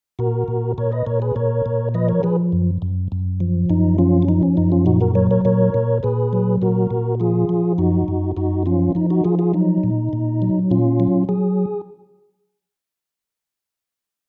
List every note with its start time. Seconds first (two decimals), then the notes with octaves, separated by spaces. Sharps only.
0.19 A#2 F#4 A#4
0.48 A#2
0.78 A#2 A#4 C#5
0.92 B4 D#5
1.06 A#2 A#4 C#5
1.22 G#4 B4
1.36 A#2 A#4 C#5
1.66 A#2
1.94 F3 B4 D#5
2.08 A#4 C#5
2.23 F3 G#4 B4
2.52 F#2
2.82 F#2
3.12 F#2
3.40 F3
3.70 F#2 D#4
3.98 F3 C#4 F4
4.22 C#4
4.28 F3 D#4
4.43 C#4
4.57 F#2 D#4
4.72 C#4 F4
4.86 A#2 D#4 F#4
5.01 F#4 A#4
5.15 F#3 A#4 C#5
5.31 A#4 C#5
5.45 A#2 A#4 C#5
5.74 A#2
6.03 A#2 G#4 B4
6.33 F#3
6.62 A#2 F#4 A#4
6.91 A#2
7.20 F3 F4 G#4
7.49 F3
7.78 F#2 D#4 F#4
8.08 F#2
8.37 F#2 D#4 F#4
8.66 F3 C#4 F4
8.95 F3 D#4
9.10 D#4 F#4
9.24 F3 F4 G#4
9.39 F4 G#4
9.54 F#3 D#4
9.84 A#2
10.13 A#2
10.42 F#3
10.71 A#2 C#4 F4
11.00 F#3
11.29 F#3 G#4